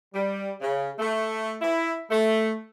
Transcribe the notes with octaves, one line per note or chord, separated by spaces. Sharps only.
G3
C#3
A3
E4
A3